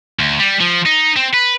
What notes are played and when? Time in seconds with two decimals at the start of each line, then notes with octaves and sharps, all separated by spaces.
0.19 D2
0.39 G3
0.60 F3
0.86 D#4
1.17 C4
1.34 B4